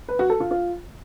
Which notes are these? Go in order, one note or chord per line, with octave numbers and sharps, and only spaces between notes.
B4
F#4
A4
F4
F4